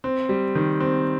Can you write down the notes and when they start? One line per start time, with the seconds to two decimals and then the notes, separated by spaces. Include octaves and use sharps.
0.04 C4
0.29 G3
0.55 D#3
0.80 C4